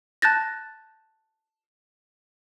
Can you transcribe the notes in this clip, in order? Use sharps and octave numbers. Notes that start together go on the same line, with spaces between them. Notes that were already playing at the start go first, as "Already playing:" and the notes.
A5 F#6 G6 A6 A#6